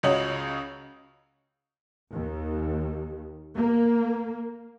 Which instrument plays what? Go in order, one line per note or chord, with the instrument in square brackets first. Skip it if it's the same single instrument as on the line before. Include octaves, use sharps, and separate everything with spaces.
[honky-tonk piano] C#2 C#3 F#4 C#5 D#5 F#7
[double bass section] D#2
A#3